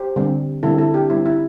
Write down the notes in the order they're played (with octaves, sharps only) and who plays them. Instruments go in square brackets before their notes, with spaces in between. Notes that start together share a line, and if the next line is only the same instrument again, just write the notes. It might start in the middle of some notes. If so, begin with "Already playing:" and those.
Already playing: [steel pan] G4 C5
D3 G3 C4
D3 G3 C4 E4 A4
E4 A4
D4 G4
D3 G3 C4 E4
E4